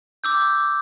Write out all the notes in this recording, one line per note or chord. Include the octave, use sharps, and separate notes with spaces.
D6 E6 G6